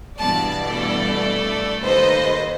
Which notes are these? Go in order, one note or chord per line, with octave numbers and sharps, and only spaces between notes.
G2 B2 E3 D5 A5
A3 A4
D#2 B4 C5 D#5